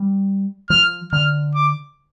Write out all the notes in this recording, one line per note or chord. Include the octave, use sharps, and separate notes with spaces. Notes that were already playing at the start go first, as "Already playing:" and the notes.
Already playing: G3
F3 F6
D3 F6
D6